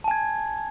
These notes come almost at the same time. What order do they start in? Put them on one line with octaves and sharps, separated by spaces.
A5 G#5 G#6